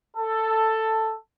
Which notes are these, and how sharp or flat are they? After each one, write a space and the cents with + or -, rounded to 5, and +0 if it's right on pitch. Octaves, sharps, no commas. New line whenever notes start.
A4 +10